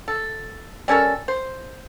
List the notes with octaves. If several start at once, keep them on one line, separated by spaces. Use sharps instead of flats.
A4
G3 C#4 A4 A#4
C5